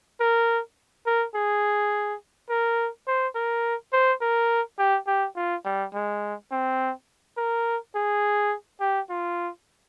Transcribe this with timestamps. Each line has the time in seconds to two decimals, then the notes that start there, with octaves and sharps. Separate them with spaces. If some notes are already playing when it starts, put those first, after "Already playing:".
0.20 A#4
1.06 A#4
1.35 G#4
2.49 A#4
3.07 C5
3.35 A#4
3.93 C5
4.21 A#4
4.78 G4
5.07 G4
5.36 F4
5.65 G3
5.94 G#3
6.52 C4
7.37 A#4
7.95 G#4
8.80 G4
9.10 F4